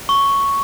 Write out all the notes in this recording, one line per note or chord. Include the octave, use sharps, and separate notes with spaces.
C#6